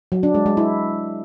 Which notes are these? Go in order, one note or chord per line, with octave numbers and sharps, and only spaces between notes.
F#3
D4
G#3
G#3
E4